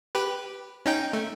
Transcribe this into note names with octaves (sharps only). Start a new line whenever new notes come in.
G4 B4
C#4 D#4 G5
A3